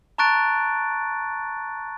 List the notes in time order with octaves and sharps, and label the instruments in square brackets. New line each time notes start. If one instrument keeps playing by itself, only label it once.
[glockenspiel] A5 A#5 C#6 F#6 A6 D7